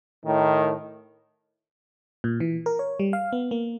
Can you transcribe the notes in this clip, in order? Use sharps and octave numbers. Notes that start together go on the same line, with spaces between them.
A2 D#3
A#2
E3
A#4
C#5
G3
F5
B3
A#3